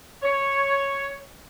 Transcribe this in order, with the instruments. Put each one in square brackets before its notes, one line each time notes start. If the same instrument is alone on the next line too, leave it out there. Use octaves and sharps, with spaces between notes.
[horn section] C#5